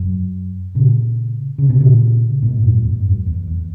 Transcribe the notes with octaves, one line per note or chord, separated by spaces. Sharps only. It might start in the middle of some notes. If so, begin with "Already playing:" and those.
Already playing: F#2
A#2 C#3
C#3
B2
A#2 C#3
G#2 B2
F#2 A#2
E2 G#2
F#2
E2
E2